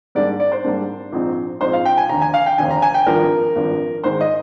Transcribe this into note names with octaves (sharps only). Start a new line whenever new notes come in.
G#2 G3 A#3 D4 D5
D5
C5
G#2 G3 A#3 D4
A#1 G#2 F3 C4 D#4
A#1 G#2 F3 C4 D#4 C5
F5
G5
G#5
F1 D#2 D3 A#5
G#5
F5
G5
F1 D#2 D3 G#5
A#5
G#5
G5
G#1 G2 F3 A#4
G#1 G2 F3
G#2 D#3 G#3 C5
D#5